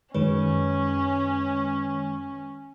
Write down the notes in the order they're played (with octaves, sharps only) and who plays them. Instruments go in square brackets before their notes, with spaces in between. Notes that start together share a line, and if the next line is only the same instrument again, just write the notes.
[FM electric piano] F#2 D#3 G#3 [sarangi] C#4 [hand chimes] B4 C#5